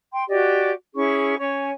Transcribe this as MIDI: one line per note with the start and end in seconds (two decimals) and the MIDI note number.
0.12 0.22 79
0.12 0.22 84
0.28 0.70 66
0.28 0.70 67
0.28 0.70 74
0.28 0.70 75
0.93 1.37 61
0.93 1.37 64
0.93 1.37 68
0.93 1.37 85
1.38 1.68 61
1.38 1.68 73
1.38 1.68 80
1.38 1.68 85